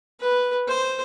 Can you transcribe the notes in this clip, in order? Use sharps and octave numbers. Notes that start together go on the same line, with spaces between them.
B4
C5